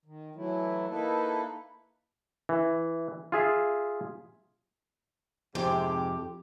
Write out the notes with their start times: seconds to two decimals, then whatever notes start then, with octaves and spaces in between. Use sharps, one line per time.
0.05 D#3
0.36 E3 F#3 A3 E4
0.89 A#3 D#4 E4 A4 B4
2.49 E3
3.32 F4 G#4 E5
5.55 F2 G#2 C3 G4